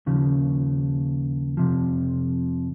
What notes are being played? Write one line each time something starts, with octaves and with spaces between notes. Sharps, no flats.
D#2 C#3 F3
F2 C3 F3